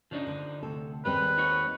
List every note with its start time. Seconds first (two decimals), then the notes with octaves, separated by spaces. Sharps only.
0.11 C#3 F3 D4 D#4
0.27 D3
0.63 D2 C3 A4
1.05 D#2 G3 G#3 C4 B4
1.38 D#4 F#4 C#5